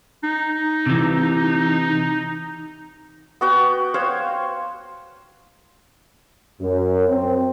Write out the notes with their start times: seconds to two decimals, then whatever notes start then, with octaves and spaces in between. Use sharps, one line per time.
0.24 D#4
0.86 C3 E3
3.41 B3 F#4 G5
3.94 C5 C#5 F5
6.61 F#2
7.09 C4